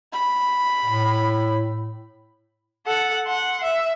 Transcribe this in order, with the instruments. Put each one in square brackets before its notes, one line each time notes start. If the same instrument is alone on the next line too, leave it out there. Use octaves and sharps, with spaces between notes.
[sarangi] B5
[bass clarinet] A2
[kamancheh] A4 F#5
F#5 C6
E5